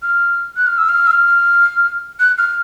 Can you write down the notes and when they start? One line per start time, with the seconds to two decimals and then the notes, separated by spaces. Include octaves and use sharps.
0.03 F6
0.57 F#6
0.67 F6
0.78 E6
0.89 F6
1.07 E6
1.11 F6
2.20 F#6
2.38 F6